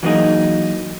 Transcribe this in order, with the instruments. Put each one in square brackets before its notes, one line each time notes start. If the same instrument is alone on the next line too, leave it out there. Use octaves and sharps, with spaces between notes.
[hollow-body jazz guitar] E3 F#3 A#3 B3 D#4 G#4